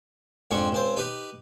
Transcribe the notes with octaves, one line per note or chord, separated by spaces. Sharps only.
F2 G#2 C4 D4 C#6
C#2 C4 C5
D#4 G4 B4